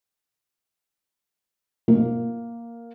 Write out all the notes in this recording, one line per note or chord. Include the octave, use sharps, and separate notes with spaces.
A#3